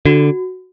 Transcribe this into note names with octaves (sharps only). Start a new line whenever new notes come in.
D3 F#4